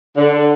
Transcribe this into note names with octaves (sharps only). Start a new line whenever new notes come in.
D3